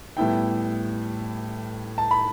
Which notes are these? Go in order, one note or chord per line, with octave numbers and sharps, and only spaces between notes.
A2 G3 B3 E4 G5
A5
B5